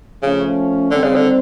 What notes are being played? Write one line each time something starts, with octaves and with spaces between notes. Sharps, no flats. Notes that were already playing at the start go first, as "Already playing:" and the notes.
C#3 F3 A3 C#4
D3 D#3 G3 C4
C#3
D3